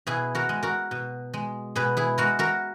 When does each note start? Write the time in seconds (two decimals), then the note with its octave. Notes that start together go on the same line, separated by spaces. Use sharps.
0.07 B2 E4 G#4
0.35 F#4 A#4
0.49 G#3
0.63 F#4 A#4
0.91 B2
1.34 G#3
1.76 B2 G#4 B4
1.97 E4 G#4
2.18 G#3 F#4 A#4
2.39 F#4 A#4